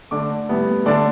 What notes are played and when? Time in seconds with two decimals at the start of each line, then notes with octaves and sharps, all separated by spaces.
0.11 D3 A3 D4 D6
0.49 A2 G3 B3
0.86 D3 A3 D4 D5